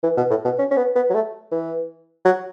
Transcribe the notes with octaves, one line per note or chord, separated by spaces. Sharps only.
E3
B2
A2
B2
C#4
C#4
B3
B3
F#3
A3
E3
F#3